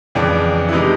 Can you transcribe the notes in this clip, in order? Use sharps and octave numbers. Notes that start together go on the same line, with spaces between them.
F2 C#3 E3 D4
E4
C3 E3 G#3 D#4